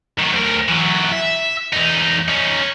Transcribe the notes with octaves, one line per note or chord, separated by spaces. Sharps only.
D#3 F#3
D2 A#4
E3 F#3
E5
E2 D#4
C#4 D#4